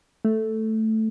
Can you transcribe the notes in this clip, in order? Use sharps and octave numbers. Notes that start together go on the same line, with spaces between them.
A3